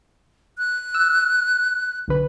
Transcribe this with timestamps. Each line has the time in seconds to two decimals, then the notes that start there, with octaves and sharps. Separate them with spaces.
0.58 F#6
0.94 E6
2.08 B1 D3 B4